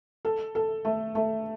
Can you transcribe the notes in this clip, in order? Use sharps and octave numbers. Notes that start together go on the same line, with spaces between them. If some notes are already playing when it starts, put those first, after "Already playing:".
A4
A4
A3
A3